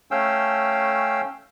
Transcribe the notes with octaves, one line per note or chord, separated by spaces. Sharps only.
A3 C#4 F5 G5 E6